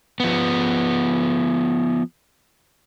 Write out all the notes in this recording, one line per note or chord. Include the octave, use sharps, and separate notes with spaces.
F3 B3